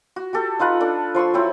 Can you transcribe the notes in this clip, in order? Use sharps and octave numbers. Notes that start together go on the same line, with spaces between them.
F#4
F#4 G4 A4
D#4 F4 B4 F#5
D4 A4
F3 C6 C#6 E6
F#3 C4 E4